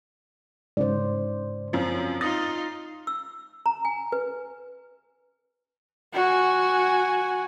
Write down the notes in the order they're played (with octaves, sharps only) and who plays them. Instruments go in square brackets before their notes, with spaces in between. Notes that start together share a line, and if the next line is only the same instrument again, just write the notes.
[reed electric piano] G#2 C#3 [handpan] C5 D5
[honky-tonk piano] F#2 F3 [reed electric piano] C4
[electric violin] D#4 F4 [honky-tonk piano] D#6 A6 A#6
[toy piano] E6
A#5
G#5
B4
[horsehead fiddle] F#4 G#5